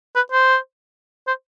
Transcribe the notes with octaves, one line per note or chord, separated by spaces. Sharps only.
B4
C5
C5